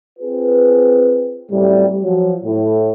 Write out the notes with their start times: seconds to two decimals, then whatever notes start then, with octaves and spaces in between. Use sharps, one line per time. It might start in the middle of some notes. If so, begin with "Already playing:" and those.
0.19 C4 F4 G#4 B4
1.50 F#2 A2 C3 G3
2.03 F3 F#3
2.43 A2